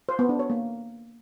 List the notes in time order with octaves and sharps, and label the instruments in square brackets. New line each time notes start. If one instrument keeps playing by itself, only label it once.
[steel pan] C5
B3
D4
C#5
A#3